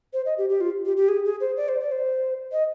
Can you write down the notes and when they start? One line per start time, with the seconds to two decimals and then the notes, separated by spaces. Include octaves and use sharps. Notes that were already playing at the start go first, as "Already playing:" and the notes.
0.13 C5
0.26 D#5
0.38 G4
0.50 G4
0.61 F4
0.86 G4
0.97 G4
1.08 G#4
1.25 G#4
1.41 C5
1.57 D5
1.68 C5
1.80 D5
1.92 C5
2.52 D#5